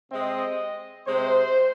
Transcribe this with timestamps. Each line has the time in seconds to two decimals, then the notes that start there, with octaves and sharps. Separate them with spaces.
0.11 C3 G#3 C4 D#5
1.07 C3 G#3 C4 C5